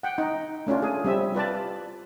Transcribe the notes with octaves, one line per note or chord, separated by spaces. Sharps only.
F#5 G5
D#4
A3 C#4 D4 F4
G#4
G3 C4 E5
F4 B4 D5 A5